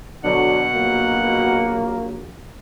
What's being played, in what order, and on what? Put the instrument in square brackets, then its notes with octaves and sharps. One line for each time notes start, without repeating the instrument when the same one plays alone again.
[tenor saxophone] B2 [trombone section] D3 F#3 [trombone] D4 [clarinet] F#5
[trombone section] A#1 F#3 [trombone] A#3